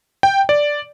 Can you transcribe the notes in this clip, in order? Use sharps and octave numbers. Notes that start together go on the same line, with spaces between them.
G5
D5